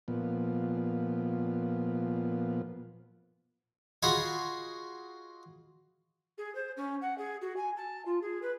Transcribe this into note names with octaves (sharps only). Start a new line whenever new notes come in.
A#2 F3 B3
F4 F#4 G#4 D#5 B5 C6
G#4
C5
C#4
F#5
G#4
F#4
G#5
A5
F4
G#4
B4